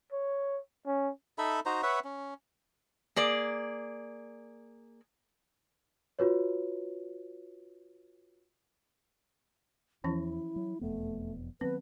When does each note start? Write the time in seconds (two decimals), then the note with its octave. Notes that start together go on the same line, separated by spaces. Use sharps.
0.12 C#5
0.86 C#4
1.38 D#4 A4 E5 B5
1.66 D#4 F#4 C5 A#5
1.83 B4 C#5 E5 F#5
2.04 C#4
3.16 A#3 G#4 D5
6.19 F4 F#4 B4 C#5
10.04 E2 E3 F3 C#4 E4
10.56 F#3
10.81 E1 F2 A3 B3
11.61 D#3 F#3 B3 C4 B4